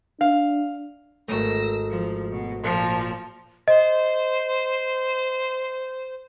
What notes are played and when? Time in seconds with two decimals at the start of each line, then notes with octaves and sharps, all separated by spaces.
0.21 D4 F5
1.28 G#1 A3 E6 A#6
1.89 F3
2.31 B2
2.62 A#2 F3
3.68 C5 D#5